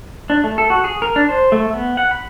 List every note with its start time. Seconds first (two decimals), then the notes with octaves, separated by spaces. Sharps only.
0.30 D4
0.44 A3
0.58 A4
0.70 F#4
0.84 G#4
1.02 A#4
1.16 D4
1.29 C5
1.52 A3
1.73 B3
1.97 F#5
2.11 B5